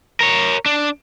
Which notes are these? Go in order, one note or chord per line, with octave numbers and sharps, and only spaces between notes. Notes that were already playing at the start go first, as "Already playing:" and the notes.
A#4 C#5
D4